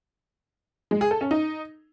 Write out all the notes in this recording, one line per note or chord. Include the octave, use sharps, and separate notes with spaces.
G#3
G#4
A4
C#4
D#4